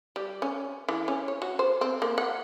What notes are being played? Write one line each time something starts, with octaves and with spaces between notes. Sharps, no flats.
G3
C#4
E3
C#4
C#5
F#4
C5
C4
A#3
F#5